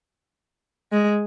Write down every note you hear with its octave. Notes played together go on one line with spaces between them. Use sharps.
G#3